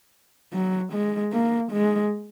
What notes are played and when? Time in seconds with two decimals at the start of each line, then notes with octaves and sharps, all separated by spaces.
0.53 F#3
0.93 G#3
1.32 A#3
1.72 G#3